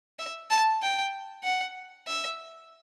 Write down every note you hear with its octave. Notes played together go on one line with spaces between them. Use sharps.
E5
A5
G5
F#5
E5